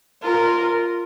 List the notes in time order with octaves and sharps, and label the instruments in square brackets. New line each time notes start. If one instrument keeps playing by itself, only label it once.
[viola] F4 [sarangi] A#4